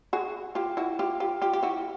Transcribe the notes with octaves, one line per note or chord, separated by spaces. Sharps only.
F#4 G#4
F4 G4
E4 F#4
F4 G4
F4 G4
F4 G4
G4
E4 F#4